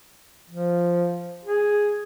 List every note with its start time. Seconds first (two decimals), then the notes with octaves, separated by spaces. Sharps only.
0.50 F3
1.45 G#4